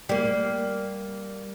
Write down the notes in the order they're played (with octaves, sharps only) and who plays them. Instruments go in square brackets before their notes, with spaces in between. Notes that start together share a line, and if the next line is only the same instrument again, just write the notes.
[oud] G3 A#3